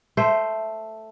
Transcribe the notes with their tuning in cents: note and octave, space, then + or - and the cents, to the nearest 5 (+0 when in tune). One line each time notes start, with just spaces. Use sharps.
A3 +0 C5 +0